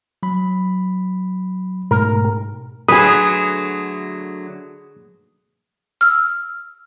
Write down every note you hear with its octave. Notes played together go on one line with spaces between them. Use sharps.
F#3 B5
G#2 B2 A3 A#4
D3 F#3 A3 G#4 B4 D#6
E6 F6